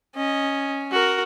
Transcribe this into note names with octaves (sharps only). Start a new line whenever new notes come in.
C#4 D#5
F#4 A#4